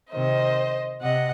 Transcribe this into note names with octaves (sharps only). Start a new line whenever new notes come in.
C3 D#3 C5 D#5
C3 D#5 F#5